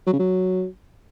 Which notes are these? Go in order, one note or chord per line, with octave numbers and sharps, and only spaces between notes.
F#3
C#3
F#3